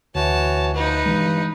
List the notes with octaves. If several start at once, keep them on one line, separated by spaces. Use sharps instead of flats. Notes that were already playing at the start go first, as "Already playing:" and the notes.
D2 E3 F#4 C#5 A5
F3 D#4 B4
G2 E3 G#3